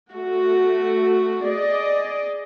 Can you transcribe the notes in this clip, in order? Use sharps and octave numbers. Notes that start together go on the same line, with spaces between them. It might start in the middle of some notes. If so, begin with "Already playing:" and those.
A3 F#4
G#4 D5 D#5